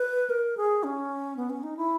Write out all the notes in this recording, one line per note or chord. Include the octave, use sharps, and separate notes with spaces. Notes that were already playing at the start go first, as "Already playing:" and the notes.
Already playing: B4
A#4
G#4
C#4
B3
C#4
D#4
E4